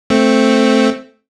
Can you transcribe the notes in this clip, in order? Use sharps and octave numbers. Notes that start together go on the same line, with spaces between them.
A3 C4